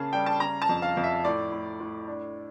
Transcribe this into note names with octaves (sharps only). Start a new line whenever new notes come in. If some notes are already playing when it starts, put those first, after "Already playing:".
Already playing: C#3 A#3 A5
G3 G5
A5
C#3 A#5
A5
F2
F5
F2
E5
A2 D5
A2
A2
D4